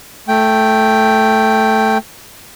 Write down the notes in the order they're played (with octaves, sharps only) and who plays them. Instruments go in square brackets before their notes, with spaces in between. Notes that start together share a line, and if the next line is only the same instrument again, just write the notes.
[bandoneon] A3 G5